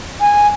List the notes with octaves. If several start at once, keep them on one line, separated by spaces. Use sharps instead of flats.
G#5